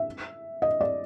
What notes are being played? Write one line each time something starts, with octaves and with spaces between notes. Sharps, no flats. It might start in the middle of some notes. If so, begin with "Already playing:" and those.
Already playing: E5
D#5
D5